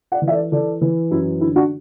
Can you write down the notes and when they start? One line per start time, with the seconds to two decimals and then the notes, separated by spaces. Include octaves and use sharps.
0.12 D5 F#5
0.22 E3
0.28 E5
0.32 A4 D5
0.52 E3 A4 D5
0.81 E3
1.11 F#2 E4
1.41 D3 E4
1.56 D4 F#4